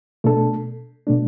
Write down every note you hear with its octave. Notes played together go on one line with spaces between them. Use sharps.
B2 A3 D4 A4
B2 A3 D4